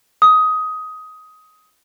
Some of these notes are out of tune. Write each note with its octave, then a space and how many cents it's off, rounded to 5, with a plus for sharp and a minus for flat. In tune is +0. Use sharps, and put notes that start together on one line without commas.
D#6 +15